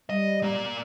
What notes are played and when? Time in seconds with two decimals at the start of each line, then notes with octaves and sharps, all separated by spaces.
0.10 G3 D#5
0.43 A#3 D5